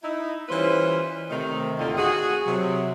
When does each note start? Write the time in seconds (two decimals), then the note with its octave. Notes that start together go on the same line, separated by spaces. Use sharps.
0.02 D#4 E4
0.49 E3 G3 C#4 F4 B4 C5
1.30 C3 D#3 A3
1.78 D#2 A2 D3 D#3 C4 F4
1.97 F#4 G#4
2.46 C3 F#3